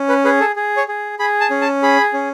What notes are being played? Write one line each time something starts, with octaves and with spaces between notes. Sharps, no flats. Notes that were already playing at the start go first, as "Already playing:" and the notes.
Already playing: C#4
B4
G#4 B4
A4
G#4
C#5
G#4
G#4 B5
A5
C#4
A5
G#4 B5
C#4